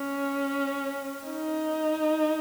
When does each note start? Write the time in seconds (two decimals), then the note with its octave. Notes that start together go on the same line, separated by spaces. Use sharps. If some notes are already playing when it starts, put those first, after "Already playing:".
Already playing: C#4
1.27 D#4